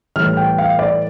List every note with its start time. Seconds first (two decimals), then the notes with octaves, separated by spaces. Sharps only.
0.16 A2 E3 G3 F6
0.37 G5
0.58 F5
0.79 D5